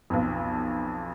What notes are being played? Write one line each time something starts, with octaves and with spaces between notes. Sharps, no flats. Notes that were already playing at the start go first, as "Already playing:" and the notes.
B1 F2